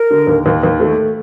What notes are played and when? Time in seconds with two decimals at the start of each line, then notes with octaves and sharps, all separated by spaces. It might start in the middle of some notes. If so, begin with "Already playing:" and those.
Already playing: A#4
0.10 D3
0.27 D#2
0.46 D#2
0.63 D#2
0.80 A3